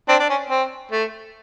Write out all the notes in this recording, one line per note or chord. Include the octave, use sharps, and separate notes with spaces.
C4 D4
D4
C#4
C4
A3